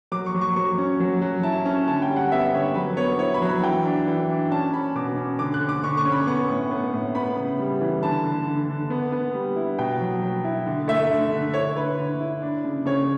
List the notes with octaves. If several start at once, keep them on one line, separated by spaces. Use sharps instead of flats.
F#3 D6
C#6
F#3
C#6
F#3 C#6
C#4
F#3
F#3
E4 A5
C#4
D3 A5
G5
G3
F#5
B3 E5
D3 C#5
F#3 B4
B3 C#5
E4 C#5
B5
F#3
B5
E3 G5
D4
E3
D4
C#4 A5
C#4 B5
B2 D6
C#4
D3 D6
F#6
D3
D6
D3 C#6
C#6
C#4
B5
B3 C#6
A2
B3
A2
B3 B5
C#3
G3
E3
D3 A5
D3
D3
D3
B3
B3
G3
E4
B2 G5
F#3
F#3
E4
D3
A3 E5
D3
D3
E4 C#5
D3 B4
D3
E4
D4
C#3
C#3 C#5